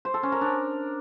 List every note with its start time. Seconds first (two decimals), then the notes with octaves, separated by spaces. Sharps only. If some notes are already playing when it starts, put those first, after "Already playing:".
0.05 C5
0.14 A4
0.23 C#4
0.32 A#4
0.41 D4